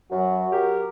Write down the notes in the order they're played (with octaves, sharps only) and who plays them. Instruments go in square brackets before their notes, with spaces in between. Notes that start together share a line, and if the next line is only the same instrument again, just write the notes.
[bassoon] F#2 [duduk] F#3 [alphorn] F#4
[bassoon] G4 [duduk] A#4